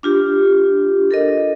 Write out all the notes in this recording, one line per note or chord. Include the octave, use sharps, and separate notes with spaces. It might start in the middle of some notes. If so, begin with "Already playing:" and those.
D4 F4 G4
A4 A#4 D#5